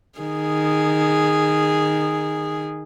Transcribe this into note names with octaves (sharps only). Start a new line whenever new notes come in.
D#3 G#4